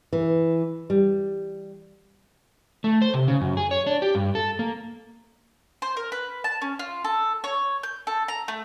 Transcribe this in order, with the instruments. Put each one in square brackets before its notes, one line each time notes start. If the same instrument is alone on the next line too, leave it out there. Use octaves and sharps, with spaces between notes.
[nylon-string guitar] E3
G3
[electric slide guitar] A3
C5
C3
C#3
F#2
G#4
C#5
D4
G4
G2
A4
A#3
[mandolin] C5
A#4
B4
A5
C#4
F4
A4
C#5
G6
A4
A#5
A3